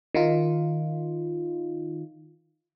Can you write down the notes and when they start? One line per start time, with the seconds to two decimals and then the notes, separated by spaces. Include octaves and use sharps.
0.15 D#3 D#4 F4